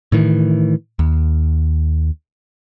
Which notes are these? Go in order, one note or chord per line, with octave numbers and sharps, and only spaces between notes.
A2 D#3 E3
D#2